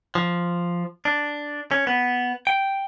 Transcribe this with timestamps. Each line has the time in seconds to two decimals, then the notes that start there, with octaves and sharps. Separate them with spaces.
0.15 F3
1.05 D4
1.71 C#4
1.87 B3
2.47 G5